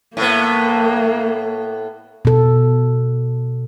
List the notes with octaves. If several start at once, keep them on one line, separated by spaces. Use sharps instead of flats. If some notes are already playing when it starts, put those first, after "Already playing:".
A2 A#3 B3
B2 A4